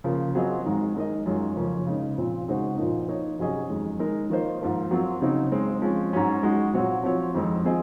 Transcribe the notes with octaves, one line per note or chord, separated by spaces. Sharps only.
C#3 F3 A#3
F#3 C4 F4 G#4 D#5
G#2 D#3 G#3
G#3 D#4 A#4 D#5
F#2 D#3 G#3 C#4 F4
F2 C#3 F3 A#3 C#4
C#3 G#3 D#4
A#2 F3 C4
C#3 G#3 D#4 F#4 C5
A#2 F3 A#3 D#4
F3 A#3 D#4 A#4 C#5
C3 F#3 C#4 G#4 D#5
F2 D#3 G#3
G#3 D#4 A#4
D#3 A#3 F4 C5 D#5
G#2 F3 A#3
F#3 C4 F4
C#3 F#3 C4 D#4
G#3 C4 D#4
F3 G#3 C#4
G#2 F#3 C#4
G#3 D#4 F#4
A#2 F#3 C4 F#4 C#5
F3 C4 F#4 C#5
F2 D#3 G#3 C4 D#4
F3 C4 F4 G#4 D#5